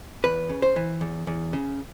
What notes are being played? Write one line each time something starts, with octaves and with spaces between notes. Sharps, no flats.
E2 B4
C#3
C5
E3
E2
E2
C#3